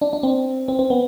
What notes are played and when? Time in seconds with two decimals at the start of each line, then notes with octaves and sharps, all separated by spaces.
0.01 D4
0.13 D4
0.23 C4
0.68 C4
0.79 C4
0.90 B3